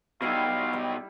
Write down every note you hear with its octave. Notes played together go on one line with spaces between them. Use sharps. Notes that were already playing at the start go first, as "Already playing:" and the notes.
B2 G3 D#4 E4 F5
G3